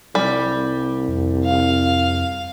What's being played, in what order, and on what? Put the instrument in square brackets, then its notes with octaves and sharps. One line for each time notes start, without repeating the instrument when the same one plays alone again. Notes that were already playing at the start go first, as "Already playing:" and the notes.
[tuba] C2 [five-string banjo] G3
[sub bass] F2
[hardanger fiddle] F5